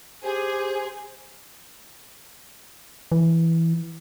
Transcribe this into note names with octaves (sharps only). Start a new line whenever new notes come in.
G4 G#4 C5
E3